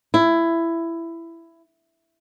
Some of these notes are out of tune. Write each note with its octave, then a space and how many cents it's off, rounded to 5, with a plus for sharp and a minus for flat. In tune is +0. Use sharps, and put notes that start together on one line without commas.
E4 +15